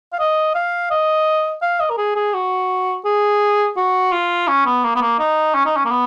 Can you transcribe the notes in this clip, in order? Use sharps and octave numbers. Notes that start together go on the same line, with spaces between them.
F5
D#5
F5
D#5
F5
D#5
A#4
G#4
G#4
F#4
G#4
F#4
F4
C#4
B3
A#3
B3
A#3
D#4
C#4
D#4
C#4
A#3
B3